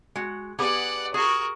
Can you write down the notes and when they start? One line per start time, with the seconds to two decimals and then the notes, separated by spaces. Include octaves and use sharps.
0.16 G#3 F#4
0.59 B3 G4 G#4 D5 F#5
1.14 F#4 G#4 A#4